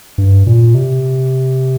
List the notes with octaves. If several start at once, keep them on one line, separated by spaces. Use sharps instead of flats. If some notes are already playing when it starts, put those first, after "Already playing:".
G2
A#2
C3